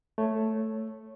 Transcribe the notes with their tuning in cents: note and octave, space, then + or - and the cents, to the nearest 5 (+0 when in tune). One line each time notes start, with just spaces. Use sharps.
A3 +0 C#5 +0